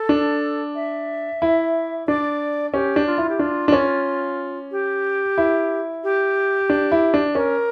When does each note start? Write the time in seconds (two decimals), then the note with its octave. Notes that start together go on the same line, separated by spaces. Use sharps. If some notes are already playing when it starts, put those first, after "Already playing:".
Already playing: A4
0.09 D4
0.75 E5
1.42 E4
2.07 D4 D5
2.73 C#4 G4
2.96 D4
3.07 F4
3.18 E4
3.29 G4
3.39 D4 F4
3.68 D4
3.72 C#4
4.72 G4
5.38 E4
6.04 G4
6.70 D4
6.92 E4
7.14 D4
7.35 C#4 A#4